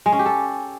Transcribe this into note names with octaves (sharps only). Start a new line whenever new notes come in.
G#3
C#4
G4
A4